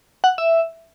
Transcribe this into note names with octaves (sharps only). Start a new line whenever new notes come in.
F#5
E5